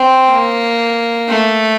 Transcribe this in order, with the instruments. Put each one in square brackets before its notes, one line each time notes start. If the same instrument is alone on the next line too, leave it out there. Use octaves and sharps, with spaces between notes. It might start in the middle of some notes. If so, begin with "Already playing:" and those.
Already playing: [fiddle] C4
A#3
A3